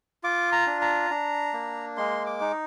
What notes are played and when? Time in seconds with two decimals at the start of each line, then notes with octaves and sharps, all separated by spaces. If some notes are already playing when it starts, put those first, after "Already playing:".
0.23 F4 D6
0.52 A#5
0.67 D4
0.81 A#5
1.10 D4
1.53 A#3
1.97 G#3 C6
2.26 D6
2.41 D#4